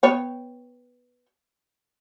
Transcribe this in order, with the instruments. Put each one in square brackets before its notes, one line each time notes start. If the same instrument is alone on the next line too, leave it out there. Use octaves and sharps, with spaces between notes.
[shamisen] B3 C#5 G5